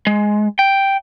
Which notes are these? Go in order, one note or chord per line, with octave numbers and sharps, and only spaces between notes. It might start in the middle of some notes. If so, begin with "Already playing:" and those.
G#3
G5